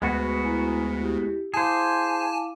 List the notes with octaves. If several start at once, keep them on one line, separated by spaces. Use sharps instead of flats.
D2 G#3 B3 F#4
E4 G#5 A#5
E4 G4
E4 G#4 C5 F5 G#5 A5 D6